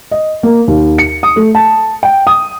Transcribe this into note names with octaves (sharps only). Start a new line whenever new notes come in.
D#5
A#3
D#2
C#7
D#6
A3
A5
G5
D#6